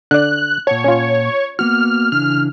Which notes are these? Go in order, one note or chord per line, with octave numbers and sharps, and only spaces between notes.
D3 D5 F#6
A#2 C#5 F#5 A5
C#4 F4
A#3 B3 F#4 F6
C#3 E3 D4 F6